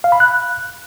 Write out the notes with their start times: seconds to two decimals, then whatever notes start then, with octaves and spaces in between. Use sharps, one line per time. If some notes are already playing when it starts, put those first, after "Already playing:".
0.04 F5
0.12 B5
0.20 F#6